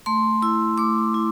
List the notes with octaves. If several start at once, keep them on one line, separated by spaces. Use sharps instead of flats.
A3 C6
E4 E6
A3 D6
E4